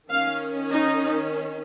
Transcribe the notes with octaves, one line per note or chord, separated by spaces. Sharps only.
D#3 C#4 F5
D#4